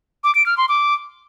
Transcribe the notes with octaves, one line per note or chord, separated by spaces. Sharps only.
D6
D7
F6
C6
D6